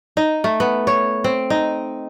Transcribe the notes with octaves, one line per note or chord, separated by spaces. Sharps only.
D#4
A3
B3
C#5
C4
D#4